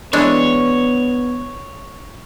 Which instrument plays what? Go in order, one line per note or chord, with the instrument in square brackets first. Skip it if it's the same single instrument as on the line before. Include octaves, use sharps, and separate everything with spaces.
[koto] E3 G#3 D4 [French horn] B3 [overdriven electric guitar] C#5